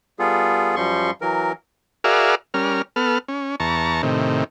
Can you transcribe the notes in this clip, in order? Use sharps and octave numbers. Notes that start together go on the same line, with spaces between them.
G3 B3 F4 G#4 A4
F#2 F3 G3 C6 C#6
E3 F#3 A#4
F#4 G#4 A#4 D5 E5 F5
G3 C#4 A#4 F6
B3 A4 F6
C#4
E2 A5 A#5 C#6
A2 C3 D#3